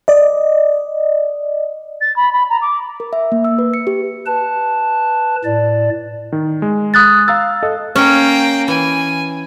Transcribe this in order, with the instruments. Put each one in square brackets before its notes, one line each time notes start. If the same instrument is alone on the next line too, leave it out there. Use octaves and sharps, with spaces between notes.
[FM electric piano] D5 D#5
[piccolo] A6
B5
B5
A#5
D6
[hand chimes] A#4
E5
A#3
E6
B4
C#7
G4
[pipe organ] B4 A5
A2 D5
[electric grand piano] D#3
G#3
[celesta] D#6 F#6 A6
[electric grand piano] F5 A#5 A6 [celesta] E6
[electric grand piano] A4 D#5
[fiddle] A#3 G5 [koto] C#4
[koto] E3 [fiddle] G#5